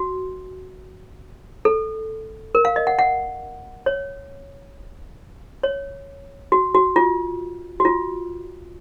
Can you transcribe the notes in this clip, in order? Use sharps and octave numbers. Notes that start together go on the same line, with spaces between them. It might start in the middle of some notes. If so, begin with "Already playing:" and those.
Already playing: F#4
A4
A#4
F5
D#5
F#5
F#5
C#5
C#5
F#4
F#4
F4
F#4
F4